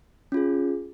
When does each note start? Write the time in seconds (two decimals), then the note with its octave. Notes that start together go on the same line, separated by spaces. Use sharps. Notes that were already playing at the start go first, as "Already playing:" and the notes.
0.32 C#4 F4 G#4